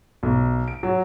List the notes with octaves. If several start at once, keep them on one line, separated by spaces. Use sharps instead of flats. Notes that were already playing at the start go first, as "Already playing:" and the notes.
B1
D7
F#3